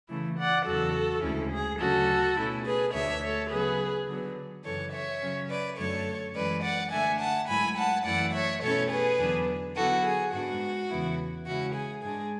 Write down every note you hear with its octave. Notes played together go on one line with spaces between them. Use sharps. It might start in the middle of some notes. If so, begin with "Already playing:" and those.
C#3 E3 A3 E4
D5 F#5
E2 C#3 F#3 F#4 A4
D2 C#3 G#3 C#4 E4
G#4
D2 C#3 F#3 C#4 F#4 A4
B2 A3 C#4 E4
G#4 B4
D2 D3 A3 D4 C#5 E5
A4 C#5
C#3 F#3 B3 G#4 B4
D3 F#3 B3
F#2 C#3 E3 A4 C#5
C#5 E5
C#3 F#3 C#4
B4 D5
F#2 D3 F#3 A3 D4 A4 C#5
F#2 E3 G#3 C#4 B4 D5
D5 F#5
D3 A3 D4 E5 G#5
F#5 A5
G#2 F#3 A3 E4 G#5 B5
F#5 A5
F#2 E3 A3 E4 D5 F#5
C#5 E5
B2 A3 C#4 E4 A4 C#5
G#4 B4
E2 D3 F#3 B3 D4
D3 F#3 B3 E4 F#4 A4
G#4
G#2 G#3 B3 D4 F#4
E2 C#3 E3 B3 E4
C#3 G#3 C#4 E4 F#4
G#4
G#2 G#3 D4 G#4